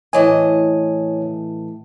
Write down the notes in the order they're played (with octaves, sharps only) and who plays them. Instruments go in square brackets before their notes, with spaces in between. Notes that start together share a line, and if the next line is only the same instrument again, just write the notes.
[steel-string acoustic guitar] A2 E3 D#5 [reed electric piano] C#5 G#5